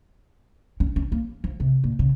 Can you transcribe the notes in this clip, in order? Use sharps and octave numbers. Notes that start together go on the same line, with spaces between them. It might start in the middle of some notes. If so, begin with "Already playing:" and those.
C#4
C#4
A#3
F3
C3
A#2
C#3